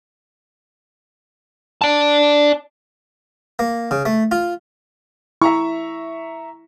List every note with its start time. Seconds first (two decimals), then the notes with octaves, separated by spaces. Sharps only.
1.82 D5 A5
3.59 A#3
3.91 C#3
4.05 A3
4.31 F4
5.42 E4 E5 A#5 C#6